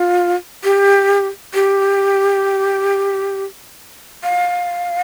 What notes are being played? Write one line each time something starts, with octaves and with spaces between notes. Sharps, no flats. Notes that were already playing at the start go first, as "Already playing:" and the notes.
Already playing: F4
G4
G4
F5